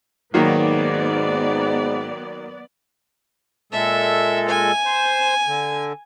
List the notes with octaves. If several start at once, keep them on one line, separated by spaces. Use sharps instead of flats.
G#2 D#3 F#3 A#3 B3 D5
A#2 G#3 A4 E5
G#5
C5
D3